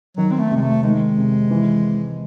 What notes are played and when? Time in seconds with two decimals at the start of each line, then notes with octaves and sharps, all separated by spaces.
0.17 D#3 F#3
0.32 C4
0.39 A3
0.51 C3
0.56 G#3
0.62 A3
0.83 D#3 G#3
1.17 C3
1.50 E3